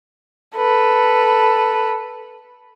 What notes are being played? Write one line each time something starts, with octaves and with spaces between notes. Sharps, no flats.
A4 B4